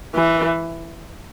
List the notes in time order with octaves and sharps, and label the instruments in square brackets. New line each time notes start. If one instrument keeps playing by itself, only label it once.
[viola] E3